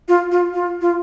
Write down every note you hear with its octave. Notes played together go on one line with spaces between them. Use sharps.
F4
F4
F4
F4